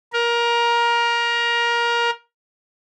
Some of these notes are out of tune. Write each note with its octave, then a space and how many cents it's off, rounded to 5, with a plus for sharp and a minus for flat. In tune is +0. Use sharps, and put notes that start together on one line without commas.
A#4 +20